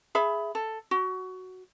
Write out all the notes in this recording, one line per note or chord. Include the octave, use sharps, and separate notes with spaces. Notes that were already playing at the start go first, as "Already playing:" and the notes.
G#4 E5 B5
A4
F#4